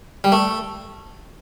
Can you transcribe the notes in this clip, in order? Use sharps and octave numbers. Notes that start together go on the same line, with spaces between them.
G3
A3